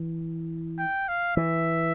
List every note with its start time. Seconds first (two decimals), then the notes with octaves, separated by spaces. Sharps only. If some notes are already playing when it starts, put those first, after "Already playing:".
Already playing: E3
0.79 G5
1.08 F5
1.37 E3 E5